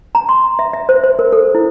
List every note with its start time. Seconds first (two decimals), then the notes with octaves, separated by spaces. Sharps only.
0.15 A#5
0.29 C6
0.59 E5
0.73 E5
0.89 C5
1.04 C5
1.19 A#4
1.32 A4
1.55 E4